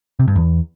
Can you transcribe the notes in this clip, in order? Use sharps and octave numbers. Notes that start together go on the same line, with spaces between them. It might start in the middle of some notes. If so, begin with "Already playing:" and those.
C3
G2
E2